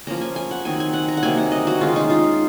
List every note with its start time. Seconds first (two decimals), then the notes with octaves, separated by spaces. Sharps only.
0.07 F3 A#3 C#4 A#5
0.21 G#5
0.36 G#5
0.51 F#5
0.65 D#3 F#3 C4 D#4 G#5
0.80 G#5
0.94 F#5
1.08 A#5
1.17 F#5
1.23 C3 F#3 A#3 D#4 G#5
1.37 F#5
1.52 D#5
1.67 F#4
1.81 D#3 G#3 C#4 F4
1.96 D#4
2.10 F4